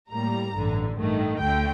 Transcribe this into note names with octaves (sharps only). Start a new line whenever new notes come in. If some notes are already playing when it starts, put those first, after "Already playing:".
A2 G3 A#3 A#5
A1 G2 D3
A1 G2 D#3 A3
D2 D3 A3 G5